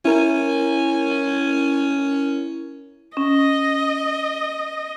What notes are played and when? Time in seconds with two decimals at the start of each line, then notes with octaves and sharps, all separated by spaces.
0.05 C#4 E4 A#4
3.17 C#4 D#5